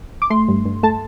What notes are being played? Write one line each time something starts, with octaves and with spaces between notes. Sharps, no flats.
D6
A3 C6
G2
G2
A3 A5